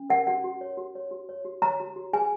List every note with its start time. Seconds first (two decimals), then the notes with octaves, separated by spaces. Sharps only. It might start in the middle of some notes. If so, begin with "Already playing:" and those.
Already playing: C#4
0.10 A#4 F#5
0.27 F#4 F#5
0.44 F#4
0.61 C#5
0.77 F#4
0.95 C#5
1.11 F#4
1.29 C#5
1.45 F#4
1.62 C#5 A#5
1.80 F#4
1.96 F#4
2.13 G#4 G#5